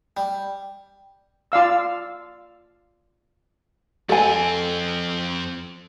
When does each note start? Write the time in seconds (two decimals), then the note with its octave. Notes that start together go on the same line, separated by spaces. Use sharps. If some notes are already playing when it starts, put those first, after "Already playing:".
0.17 G3
1.52 F4 D5 F5 E6
4.09 F2 C4 A4 G#5